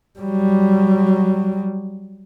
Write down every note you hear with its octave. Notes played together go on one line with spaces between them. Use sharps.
F#3 G3